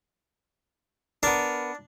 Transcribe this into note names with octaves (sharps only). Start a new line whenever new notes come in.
B3 D4 A#4